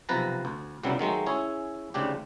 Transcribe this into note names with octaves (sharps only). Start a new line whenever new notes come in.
B1 C3 F3 B4 A5 A#5
D2
C2 F#2 C#3 E3 F#3 G3
D#3 F#3 G#3 A3
C#4 E4 G#4 C#5
D2 G#2 C#3 D4 G4